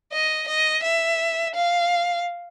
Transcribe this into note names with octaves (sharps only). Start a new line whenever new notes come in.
D#5
D#5
E5
F5